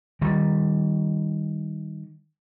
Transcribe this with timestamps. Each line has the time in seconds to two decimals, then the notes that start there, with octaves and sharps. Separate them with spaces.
0.21 D#3 G3